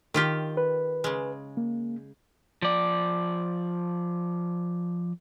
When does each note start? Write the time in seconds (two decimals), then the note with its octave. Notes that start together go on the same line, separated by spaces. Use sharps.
0.14 D#3 F4 G4
0.57 B4
1.04 C#3 G#3
1.57 A#3
2.62 F3 D5